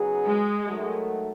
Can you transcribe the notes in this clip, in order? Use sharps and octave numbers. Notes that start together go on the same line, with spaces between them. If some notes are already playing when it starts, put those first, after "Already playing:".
Already playing: C#3 F#3 B3 D#4 G#4
G#3
D#3 F#3 A3